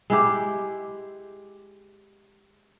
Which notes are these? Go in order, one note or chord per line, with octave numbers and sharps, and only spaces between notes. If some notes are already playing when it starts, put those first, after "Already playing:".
G#3 E4 G4